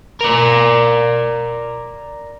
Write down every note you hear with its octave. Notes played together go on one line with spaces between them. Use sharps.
A#4 D5